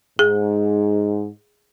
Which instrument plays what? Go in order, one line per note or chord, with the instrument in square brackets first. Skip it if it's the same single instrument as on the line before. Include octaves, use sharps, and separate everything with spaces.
[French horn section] G#2 [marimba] G#4